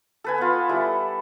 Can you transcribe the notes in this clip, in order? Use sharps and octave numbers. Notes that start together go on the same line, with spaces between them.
A4 B4 G#5
B3 F4
G3 E4 A4